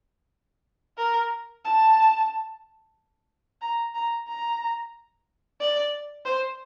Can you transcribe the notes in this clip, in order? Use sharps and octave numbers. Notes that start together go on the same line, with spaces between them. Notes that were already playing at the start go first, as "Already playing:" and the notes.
A#4
A5
A#5
A#5
A#5
D5
C5